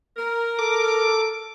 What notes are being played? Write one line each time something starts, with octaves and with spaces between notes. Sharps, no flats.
A#4
A4 D6